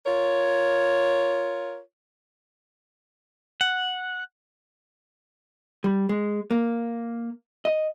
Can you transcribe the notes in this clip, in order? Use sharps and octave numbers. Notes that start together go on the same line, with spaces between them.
F4 A#4 C#5
F#5
G3
G#3
A#3
D#5